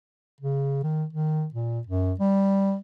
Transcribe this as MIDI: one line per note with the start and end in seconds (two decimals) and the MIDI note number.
0.41 0.82 49
0.83 1.06 51
1.13 1.47 51
1.54 1.81 46
1.87 2.14 42
2.20 2.77 55